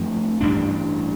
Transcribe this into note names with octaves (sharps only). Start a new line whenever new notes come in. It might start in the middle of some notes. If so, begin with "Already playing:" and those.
Already playing: G2 F3 A3 C4
A1 G2 G3 D4